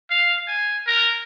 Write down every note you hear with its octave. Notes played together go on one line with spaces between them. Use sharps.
F5
G#5
A#4